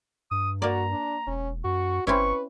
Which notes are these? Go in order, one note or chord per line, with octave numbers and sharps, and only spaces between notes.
G2 D#6
A#3 F#4 D5 A#5
D4
E1 C#4
F#2 F#4 C#6
G1 C4 C#4 E4 B4 C#6